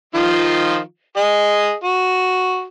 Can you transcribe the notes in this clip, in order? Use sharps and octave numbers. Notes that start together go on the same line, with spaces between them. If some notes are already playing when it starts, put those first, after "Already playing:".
D#3 F3 F4
G#4 D#5
F#4